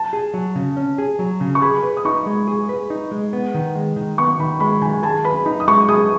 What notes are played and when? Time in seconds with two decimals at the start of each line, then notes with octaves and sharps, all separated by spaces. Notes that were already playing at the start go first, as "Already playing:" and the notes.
Already playing: A5
0.13 G#4
0.34 F#3
0.55 C#3
0.77 C#4
0.98 G#4
1.19 F#3
1.41 C#3
1.55 C#6
1.62 G#4 B5
1.83 B4
1.97 D#6
2.05 D#4 C#6
2.27 G#3
2.48 G#4
2.69 B4
2.90 D#4
3.11 G#3
3.33 B3
3.54 D#3
3.75 G#3
3.96 D#3
4.18 B3 C#6
4.39 D#3 B5
4.60 G#3 B5
4.82 D#3 G#5
5.03 G#4 A5
5.25 B4 B5
5.46 D#4 B5
5.60 D#6
5.68 G#3 C#6
5.89 G#4 D#6